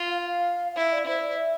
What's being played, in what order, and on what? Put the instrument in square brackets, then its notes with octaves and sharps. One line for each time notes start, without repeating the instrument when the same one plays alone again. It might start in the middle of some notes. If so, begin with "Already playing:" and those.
Already playing: [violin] F4
[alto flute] F5
F5
F5
[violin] E4 [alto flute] E5
[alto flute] D5
[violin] E4 [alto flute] C5
[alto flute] D5
E5